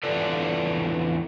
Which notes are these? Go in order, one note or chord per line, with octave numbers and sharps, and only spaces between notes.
E2 D4 F4 A4 B4 D5